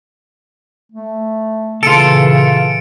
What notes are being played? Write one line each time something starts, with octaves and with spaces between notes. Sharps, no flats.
A3
A#2 C#3 E3 F4 A4 C#7 D7